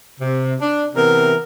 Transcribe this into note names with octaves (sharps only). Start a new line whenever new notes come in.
C3
D4
C3 E3 B3 A#4